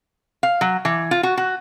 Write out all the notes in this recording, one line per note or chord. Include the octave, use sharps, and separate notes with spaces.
F5
F#3
E3
F4
F#4
F#4